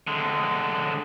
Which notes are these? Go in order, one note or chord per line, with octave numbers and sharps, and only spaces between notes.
D3 G#3